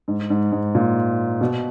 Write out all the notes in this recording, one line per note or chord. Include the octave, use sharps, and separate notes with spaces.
G#2
G#2
G#2
A#2
B2